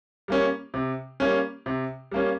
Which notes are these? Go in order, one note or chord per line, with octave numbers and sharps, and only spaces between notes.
G3 A#3 C#4
C3
G3 A#3 C#4
C3
G3 A#3 C#4